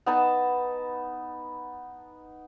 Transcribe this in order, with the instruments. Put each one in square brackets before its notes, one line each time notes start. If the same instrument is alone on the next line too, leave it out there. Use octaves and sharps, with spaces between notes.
[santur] B3 D#4 A5